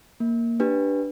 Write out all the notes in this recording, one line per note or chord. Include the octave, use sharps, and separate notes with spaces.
A#3
D4 G4 B4